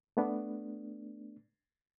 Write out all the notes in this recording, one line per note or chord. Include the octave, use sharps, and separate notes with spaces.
A3 B3 D4